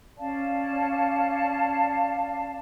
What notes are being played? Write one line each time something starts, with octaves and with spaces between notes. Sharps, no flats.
C#4 D5 F5 A5